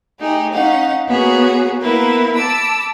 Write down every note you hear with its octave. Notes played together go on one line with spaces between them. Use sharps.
A3 D#4 G4 G#4
C#4 D#4 F5 F#5
A#3 B3 F#4 G#4 C#5
A#3 B3 E4 A#4 B4
A5 B5 D6 E6